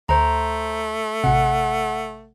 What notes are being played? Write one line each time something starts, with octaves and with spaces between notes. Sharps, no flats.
D2 A3 C5 A#5
A1 C3 F#5